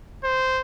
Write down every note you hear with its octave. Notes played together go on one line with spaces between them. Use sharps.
C5